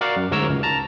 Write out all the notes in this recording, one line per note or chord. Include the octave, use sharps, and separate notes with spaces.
F#4 A#4 D5 F5 F#5
F#2
D2 G#2 A#4 C#5 E6
C#2
A5 A#5